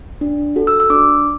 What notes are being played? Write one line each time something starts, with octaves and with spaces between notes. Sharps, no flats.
D4
F#4 A4
E6
E6
D4 D6